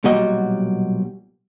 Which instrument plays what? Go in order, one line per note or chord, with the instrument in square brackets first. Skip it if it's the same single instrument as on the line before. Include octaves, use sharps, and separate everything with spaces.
[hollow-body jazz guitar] B1 A#2 G3 F#4 D#5